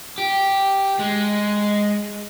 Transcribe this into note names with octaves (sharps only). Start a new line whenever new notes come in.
G4
G#3